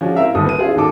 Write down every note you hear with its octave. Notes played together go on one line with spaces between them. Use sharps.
F3 G#3 C#4 D4 F#4
C4 E4 A#4 E5 F5
G1 D#2 A4 D#6
B3 D#7
C#4 E4 F4 G#4
D#2 G#2 F#4 A4 D6